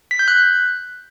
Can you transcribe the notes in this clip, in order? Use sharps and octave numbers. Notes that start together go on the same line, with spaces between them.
B6
G6
F#6